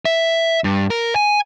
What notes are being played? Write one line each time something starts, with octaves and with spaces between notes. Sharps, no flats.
E5
G2
A#4
G#5